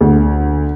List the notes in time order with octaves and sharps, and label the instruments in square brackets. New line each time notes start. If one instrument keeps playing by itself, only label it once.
[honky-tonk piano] D2